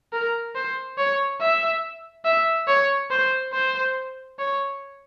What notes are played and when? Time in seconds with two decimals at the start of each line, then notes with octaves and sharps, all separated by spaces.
0.13 A#4
0.55 C5
0.98 C#5
1.41 E5
2.25 E5
2.68 C#5
3.11 C5
3.53 C5
4.39 C#5